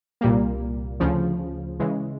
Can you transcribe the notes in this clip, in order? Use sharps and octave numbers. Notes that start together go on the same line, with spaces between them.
C2 A#2 G3 A#3
D2 C#3 F3
C#3 E3 G#3